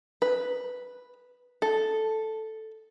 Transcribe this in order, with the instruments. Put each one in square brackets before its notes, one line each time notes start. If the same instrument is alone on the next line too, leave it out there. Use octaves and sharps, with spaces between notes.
[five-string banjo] B4
A4